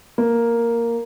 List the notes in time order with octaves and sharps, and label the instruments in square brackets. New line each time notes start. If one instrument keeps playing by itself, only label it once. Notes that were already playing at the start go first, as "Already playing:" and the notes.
[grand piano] A#3